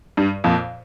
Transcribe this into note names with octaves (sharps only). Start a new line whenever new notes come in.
G2
F2 A#2